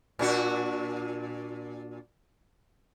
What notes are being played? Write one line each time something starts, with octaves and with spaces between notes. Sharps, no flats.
A#2 D4 F#4